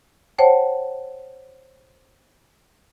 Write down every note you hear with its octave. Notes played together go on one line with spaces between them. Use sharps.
C5 C#5 F#5 G5 A5